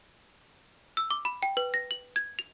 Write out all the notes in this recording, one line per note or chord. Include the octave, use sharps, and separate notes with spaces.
E6
D6
B5
G5
B4
A#6
F#7
G#6
F7